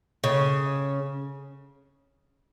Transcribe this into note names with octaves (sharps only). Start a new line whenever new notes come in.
C#3